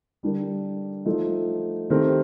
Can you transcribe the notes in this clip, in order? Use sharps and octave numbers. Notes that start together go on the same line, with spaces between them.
D3 G3 D4 G4 A#4
F3 A3 D#4
D#3 A3 C4 G4 A#4